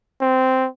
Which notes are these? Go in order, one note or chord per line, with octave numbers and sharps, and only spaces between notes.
C4